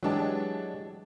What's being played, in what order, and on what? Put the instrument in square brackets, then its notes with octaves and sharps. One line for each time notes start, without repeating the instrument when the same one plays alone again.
[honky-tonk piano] E3 D4 A5 [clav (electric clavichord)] F#3 G#3 G4